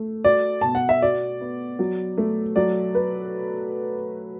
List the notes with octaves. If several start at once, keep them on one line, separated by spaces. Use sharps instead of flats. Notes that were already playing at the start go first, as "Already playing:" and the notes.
Already playing: A3
F#4 D5
B2 A5
F#5
E5
F#4 D5
B3
F#3
A3
F#3 D5
B4